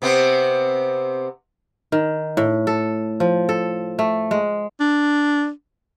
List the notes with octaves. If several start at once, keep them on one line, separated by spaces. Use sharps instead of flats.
C3 B3 C4
D#3
A2
A4
F3
A4
A3
G#3
D4